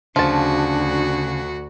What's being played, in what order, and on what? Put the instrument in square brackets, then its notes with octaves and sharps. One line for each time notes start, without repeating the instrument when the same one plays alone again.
[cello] D2 F#4 [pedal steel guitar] C#3 [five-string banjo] F3 A5 [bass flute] D4